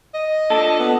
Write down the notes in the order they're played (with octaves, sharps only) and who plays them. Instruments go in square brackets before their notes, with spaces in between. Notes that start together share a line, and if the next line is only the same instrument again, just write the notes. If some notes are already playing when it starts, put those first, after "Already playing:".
[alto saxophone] D#5
[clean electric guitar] A#2 D4 A4
[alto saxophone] B3